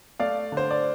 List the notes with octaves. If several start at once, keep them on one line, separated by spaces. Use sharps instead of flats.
A3 D5 F5
D3
C5
D5